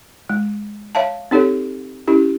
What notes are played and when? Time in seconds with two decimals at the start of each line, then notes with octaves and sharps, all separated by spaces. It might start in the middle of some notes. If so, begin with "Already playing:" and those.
0.30 G#3
0.95 C#5 E5 F5 A5
1.31 C4 D#4 G4 A4 C#5
2.08 C#4 E4 G4